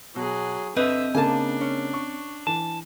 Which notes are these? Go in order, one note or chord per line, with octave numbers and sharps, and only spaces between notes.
B2 F#3 G#4
D3 C4 B4 D#5 E5
C#3 A#3 D4 G#5 A5
C#4
C#6
E3 A5